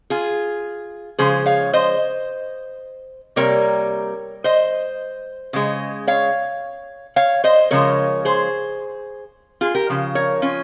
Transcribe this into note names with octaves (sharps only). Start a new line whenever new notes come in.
F4 G#4
C#3 F3 G#3 G#4 C5
C#5 F5
C5 D#5
C3 G3 A#3 A#4 C#5
C5 D#5
C#3 G#3
C#5 F5
C#5 F5
C5 D#5
C#3 F3 G#3 A#4 C#5
G#4 C5
F4 G#4
G4 A#4
C#3 F3
A#4 C#5
C#4 F4